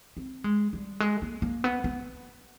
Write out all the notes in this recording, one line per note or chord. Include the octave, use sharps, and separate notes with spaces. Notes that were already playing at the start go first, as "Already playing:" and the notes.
C4
G#3
G3
G#3
A#3
A#3
B3
B3